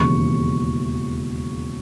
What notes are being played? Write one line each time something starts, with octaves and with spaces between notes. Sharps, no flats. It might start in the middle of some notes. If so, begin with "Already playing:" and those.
Already playing: E1 D#2 C#3 E3 C#6